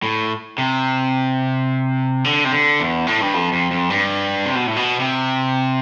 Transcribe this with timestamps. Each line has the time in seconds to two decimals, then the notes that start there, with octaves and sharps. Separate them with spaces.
0.03 A2
0.58 C3
2.24 D3
2.44 C3
2.51 D3
2.80 E2
3.07 A2
3.21 G2
3.34 F2
3.53 F2
3.71 F2
3.90 G2
4.45 C3
4.55 B2
4.67 A2
4.76 B2
5.00 C3